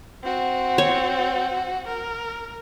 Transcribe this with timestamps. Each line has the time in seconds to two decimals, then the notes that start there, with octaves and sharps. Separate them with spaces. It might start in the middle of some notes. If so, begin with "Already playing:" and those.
0.24 C4 F#4
0.78 C#5
1.87 A#4